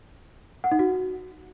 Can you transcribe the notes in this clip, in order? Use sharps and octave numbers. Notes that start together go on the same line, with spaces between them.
F#5
D#4
F#4